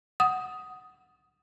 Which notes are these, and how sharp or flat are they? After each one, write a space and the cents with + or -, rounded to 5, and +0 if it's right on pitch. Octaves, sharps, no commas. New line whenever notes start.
F#5 +0 D#6 +5